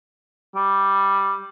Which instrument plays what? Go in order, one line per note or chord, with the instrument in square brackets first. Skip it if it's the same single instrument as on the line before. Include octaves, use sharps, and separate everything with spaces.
[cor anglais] G3